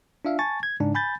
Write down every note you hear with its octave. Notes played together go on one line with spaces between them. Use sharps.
D4 F4 E5 F5
G#5 A5 C#6 A6
G#6
G#2 C#3 D4
G#5 B5 G6 A6